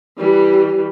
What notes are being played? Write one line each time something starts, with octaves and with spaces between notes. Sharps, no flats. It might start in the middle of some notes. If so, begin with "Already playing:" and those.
E3 G3